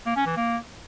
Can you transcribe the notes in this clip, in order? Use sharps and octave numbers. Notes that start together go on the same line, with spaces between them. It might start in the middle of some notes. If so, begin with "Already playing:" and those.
A#3
C#4
E3
A#3